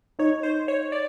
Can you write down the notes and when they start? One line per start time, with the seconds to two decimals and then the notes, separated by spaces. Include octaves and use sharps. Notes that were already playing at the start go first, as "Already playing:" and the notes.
0.19 D#4 C#5
0.43 C5
0.68 C#5
0.92 D5